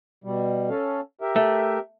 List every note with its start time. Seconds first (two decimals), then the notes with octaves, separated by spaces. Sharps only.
0.24 B2 G3
0.69 C#4 A4 F5
1.21 G4 A#4 E5
1.36 A3